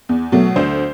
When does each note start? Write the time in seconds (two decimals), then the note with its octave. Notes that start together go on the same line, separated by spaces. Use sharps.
0.09 E2
0.32 B2 F#3 A3
0.56 D2 C5